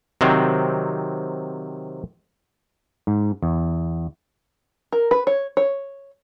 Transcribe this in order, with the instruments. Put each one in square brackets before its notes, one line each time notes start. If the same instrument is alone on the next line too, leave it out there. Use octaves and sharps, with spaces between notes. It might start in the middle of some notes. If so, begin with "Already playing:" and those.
[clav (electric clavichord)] C3 D#3 F#3 C4
G#2
E2
[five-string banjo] A#4
B4
C#5
C#5